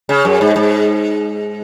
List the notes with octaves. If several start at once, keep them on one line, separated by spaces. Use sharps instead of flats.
C#3
F#2
G#2
G#2